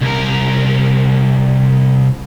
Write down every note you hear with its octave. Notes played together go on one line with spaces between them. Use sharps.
C2 A#4